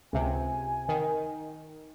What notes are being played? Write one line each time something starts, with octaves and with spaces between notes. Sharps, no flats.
C#2 C3 G#5
D#3